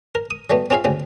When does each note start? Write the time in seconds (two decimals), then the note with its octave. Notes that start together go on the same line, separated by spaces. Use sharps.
0.15 A#4
0.31 D#6
0.50 F#3 G3 A3 B3
0.70 C4 C#4 F4 G#4 E5 F5
0.84 D2 C#3 C4